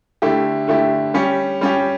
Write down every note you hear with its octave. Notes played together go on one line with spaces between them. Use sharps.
D3 A3 E4 G4
D3 A3 E4 G4
G3 C#4 G4
G3 C#4 G4